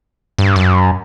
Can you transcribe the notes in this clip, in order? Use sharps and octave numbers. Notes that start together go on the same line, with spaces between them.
G2
F#2